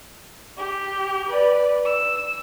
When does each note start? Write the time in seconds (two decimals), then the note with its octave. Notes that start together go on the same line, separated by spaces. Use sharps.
0.58 G4
1.30 B4 D5
1.85 E6